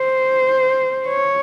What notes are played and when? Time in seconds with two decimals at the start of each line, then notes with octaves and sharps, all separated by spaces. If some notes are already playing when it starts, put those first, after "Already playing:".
Already playing: C5
1.08 C#5